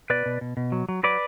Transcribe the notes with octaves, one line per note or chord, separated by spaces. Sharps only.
B2 B4 D5
B2
B2
B2
F#3
F#3
F#3 B4 D5